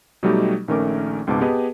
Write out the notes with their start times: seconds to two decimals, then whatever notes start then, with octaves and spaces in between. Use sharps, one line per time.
0.23 B2 F#3 G3 A3 D#4 G4
0.68 A#1 D#3 A3 C#4 A#4 D6
1.27 C#2 G#2 B2 C4 A5 D6
1.41 B3 G4 G#4 B4 D#5 A5